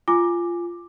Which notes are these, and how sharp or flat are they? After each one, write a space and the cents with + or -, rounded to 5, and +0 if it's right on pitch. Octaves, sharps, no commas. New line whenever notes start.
F4 -15 G#5 +0 D6 +10